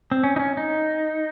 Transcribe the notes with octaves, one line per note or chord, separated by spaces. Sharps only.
C4
C#4
D#4
C#4
D#4